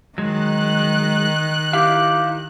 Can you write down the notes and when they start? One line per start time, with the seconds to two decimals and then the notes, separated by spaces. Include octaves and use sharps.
0.18 D#3 F#3 G#3 F#6
1.73 E4 G4 F5